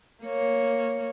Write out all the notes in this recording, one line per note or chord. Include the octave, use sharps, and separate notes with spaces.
A#3 C#5